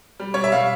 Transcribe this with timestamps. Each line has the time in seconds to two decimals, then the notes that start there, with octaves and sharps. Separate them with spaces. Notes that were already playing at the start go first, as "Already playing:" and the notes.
0.20 G3
0.34 G3 C#5
0.44 E5
0.52 G3 F5